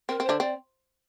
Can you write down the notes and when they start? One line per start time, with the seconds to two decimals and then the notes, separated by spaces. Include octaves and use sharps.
0.09 C4 A#4
0.20 C4
0.25 D3 D4 C5
0.40 C4 D5